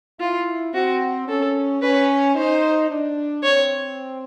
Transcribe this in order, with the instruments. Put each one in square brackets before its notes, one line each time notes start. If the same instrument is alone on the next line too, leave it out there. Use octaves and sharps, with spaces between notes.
[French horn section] E4 [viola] F4
[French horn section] C4 [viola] F#4
[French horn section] C#4 [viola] A4
[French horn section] C#4 [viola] B4
[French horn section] D#4 [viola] C5
[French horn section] D4
[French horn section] C4 [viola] C#5